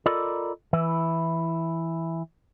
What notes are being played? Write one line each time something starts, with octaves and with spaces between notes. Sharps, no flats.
F4 A4 A#4 D5 D#5 B5
E3 E4 B4